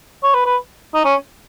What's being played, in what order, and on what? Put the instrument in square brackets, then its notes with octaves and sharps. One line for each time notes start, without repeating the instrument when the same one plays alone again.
[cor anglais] C#5
B4
B4
D#4
C#4